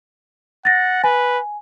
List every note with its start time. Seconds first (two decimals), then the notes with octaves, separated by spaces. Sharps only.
0.65 F#5 A6 A#6
1.04 B4 G#5